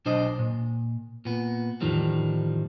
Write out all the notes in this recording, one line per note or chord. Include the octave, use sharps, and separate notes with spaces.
B1 D4 C5 D#5
A#2
A#2 B3
E2 A2 D#3 F3 G3